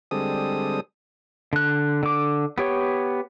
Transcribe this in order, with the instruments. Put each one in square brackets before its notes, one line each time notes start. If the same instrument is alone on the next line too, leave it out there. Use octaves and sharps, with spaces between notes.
[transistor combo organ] D3 G3 G#3 C4 A4 D#6
[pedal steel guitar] D3 F#6
D3 D6
B3 G4 C#5